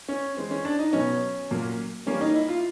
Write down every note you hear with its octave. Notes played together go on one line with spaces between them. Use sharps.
C#4
E3 G#3 C4
C#4
D4
D#4
B2 F#3 B3 C#4
A#2 F#3 A#3
E3 G3 A#3 C#4
D#4
E4
F4